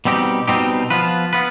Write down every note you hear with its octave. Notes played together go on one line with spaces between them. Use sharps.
B2 G3 C4 D#4 G4
B2 G3 C4 D#4 G4
F3 B3 F4 B4
B3 F4 B4